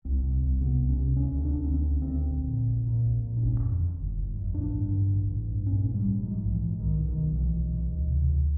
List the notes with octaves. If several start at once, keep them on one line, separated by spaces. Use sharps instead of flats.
C2 C4
C3
C2
C3 B3
C2
C#4
C3
D2 C#4
D3
D4
D2
C4
D3 C#4
D2
C4
D3
A#1
A#2
A#1
A#2
A#1
A#2
D4
G1 C#4
F2
D3
G1
G1
F2
A1 D4
G2
D3
A1
A1
G2
A#1 C#4
G#2
G3
A#1
G#2 F3
A#1
E3
G#2
B1 D#3
B2
D#3
B1
B2 E3
B1
B2
D2
C3
D2